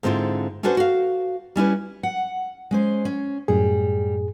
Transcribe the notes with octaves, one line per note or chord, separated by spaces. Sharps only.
G#2 D3 C4 E4 F4
C#4 D4 F#4 A4 B4 C5
F#4 F5
G3 C#4 E4 B4
F#5
G#3 C#4 C5
C#4
F#2 A2 G3 G#4